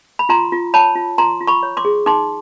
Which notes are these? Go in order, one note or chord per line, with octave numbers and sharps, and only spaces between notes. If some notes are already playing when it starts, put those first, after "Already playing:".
B5
F4 A#5 C6
F4
C#5 A5 B5
F4
F4 A#5 C6
F4
B5 C#6
C#5
C6 D6
G#4
D#4 C6 D6